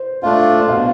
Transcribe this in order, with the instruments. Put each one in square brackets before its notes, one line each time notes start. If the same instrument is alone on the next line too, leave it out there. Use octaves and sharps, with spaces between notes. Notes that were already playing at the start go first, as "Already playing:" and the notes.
Already playing: [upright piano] C5
[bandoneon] A3 D4 F4 [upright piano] F5
[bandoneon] B2 [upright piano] F5